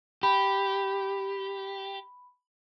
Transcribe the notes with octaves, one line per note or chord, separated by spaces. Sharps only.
G4 B5